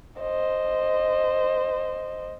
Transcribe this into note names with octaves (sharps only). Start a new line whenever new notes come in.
C5 D#5